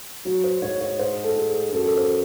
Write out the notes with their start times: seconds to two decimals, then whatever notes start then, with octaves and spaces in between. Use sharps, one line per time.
0.25 F#3 F#4
0.44 C5
0.62 G#2 C#5
0.81 C#5
0.99 C5
1.24 A4
1.36 G#4
1.72 F#2 A4
1.85 A4
1.97 C5